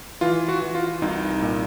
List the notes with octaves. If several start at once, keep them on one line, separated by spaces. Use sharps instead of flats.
E3 F4
F#4
E3
F4
C2 D#4
A#2